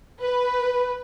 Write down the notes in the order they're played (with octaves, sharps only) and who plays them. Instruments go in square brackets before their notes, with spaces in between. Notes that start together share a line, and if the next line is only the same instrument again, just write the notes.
[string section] B4